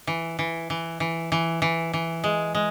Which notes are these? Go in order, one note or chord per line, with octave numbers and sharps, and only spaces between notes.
E3
E3
E3
E3
E3
E3
E3
G#3
G#3